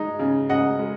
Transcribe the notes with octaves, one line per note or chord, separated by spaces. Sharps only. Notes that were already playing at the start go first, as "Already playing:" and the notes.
Already playing: G#3 D#4
C#3
C#3 D#5 F#5
G#3